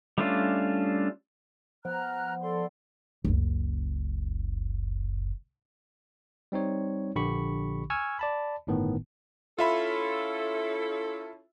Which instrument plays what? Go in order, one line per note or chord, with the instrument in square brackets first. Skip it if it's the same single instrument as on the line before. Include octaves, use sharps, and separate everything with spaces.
[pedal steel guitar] G3 A3 C#4 D4 F4
[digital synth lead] F3 [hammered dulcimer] B3 G5 [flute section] A#5 F6 F#6
[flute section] A4 D5 C6
[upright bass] F#1 C#2
[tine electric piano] G3 C4 D#4 C#5
A#1 D3 G4 B5 C#6
G#5 C#6 E6 F6 G#6
D5 A5 B5
G1 A2 D#3 B3
[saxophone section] C#4 E4 A4 [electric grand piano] F4 E5 B5